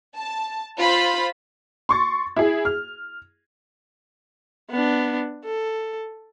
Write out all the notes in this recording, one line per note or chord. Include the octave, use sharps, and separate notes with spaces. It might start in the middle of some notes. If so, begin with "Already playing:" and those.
A5
F4 C5 B5
C6 C#6 A6
E4 G#4
F6
B3 D4
A4